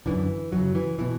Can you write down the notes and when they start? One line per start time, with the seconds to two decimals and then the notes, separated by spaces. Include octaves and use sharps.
0.06 F#2 D3 E3
0.52 F#2 C#3 F#3
0.75 E3
0.99 B2 E3